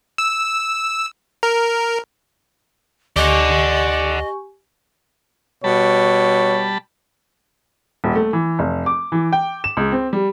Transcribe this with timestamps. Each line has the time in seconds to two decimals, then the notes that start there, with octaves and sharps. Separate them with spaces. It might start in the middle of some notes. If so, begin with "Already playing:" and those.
0.18 E6
1.43 A#4
3.16 D2 G4 D5 D#5 F#5 G#5 C#6
5.64 B2 G3 C#5 A5 B5
8.04 D#1
8.16 A3
8.33 E3
8.59 F1
8.86 D6
9.12 E3
9.33 G5
9.64 E7
9.77 C#2
9.92 C4
10.13 G3